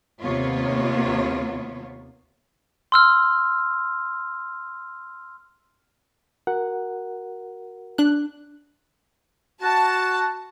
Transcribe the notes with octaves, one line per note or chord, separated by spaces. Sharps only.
D#2 C3 A#3 B3 F4 C#5
C6 E6 F6
F#4 A#4 F#5
D4 F#6
F#4 A5